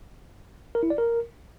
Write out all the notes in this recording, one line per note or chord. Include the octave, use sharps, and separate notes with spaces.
A#4
E4
D5
A#4